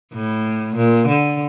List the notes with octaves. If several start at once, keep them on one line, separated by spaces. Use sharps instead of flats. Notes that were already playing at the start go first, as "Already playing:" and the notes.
A2
A#2
D3